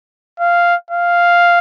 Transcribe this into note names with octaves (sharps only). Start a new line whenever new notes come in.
F5
F5